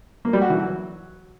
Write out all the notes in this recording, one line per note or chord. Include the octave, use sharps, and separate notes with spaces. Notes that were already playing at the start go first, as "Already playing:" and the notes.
A#3
G3
F#4
E3
F#3